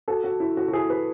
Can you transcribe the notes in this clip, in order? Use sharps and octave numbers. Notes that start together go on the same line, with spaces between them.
F#4 A4
F#4
E4
F#4
F#4
E4 G#4
G#4 B4